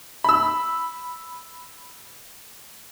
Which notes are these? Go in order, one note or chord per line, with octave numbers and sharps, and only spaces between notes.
B5 E6